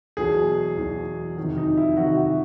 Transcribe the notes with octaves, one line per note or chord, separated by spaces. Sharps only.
E2 B2 F#3 G#4
E2 B2 F#3
F2 C3 D#3 F#3
D#4
E4
F2 C3 D#3 F#3 F#4
F#4